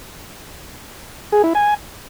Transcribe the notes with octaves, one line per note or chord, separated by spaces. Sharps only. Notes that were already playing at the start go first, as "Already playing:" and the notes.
G#4
E4
G#5